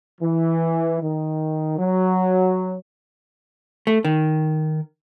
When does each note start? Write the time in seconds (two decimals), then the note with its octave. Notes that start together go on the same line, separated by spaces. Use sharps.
0.21 E3
1.02 D#3
1.78 F#3
3.87 A3
4.05 D#3